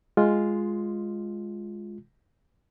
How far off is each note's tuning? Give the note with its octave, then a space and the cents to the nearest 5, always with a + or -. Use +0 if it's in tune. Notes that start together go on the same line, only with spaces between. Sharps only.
G#3 +0 F4 +0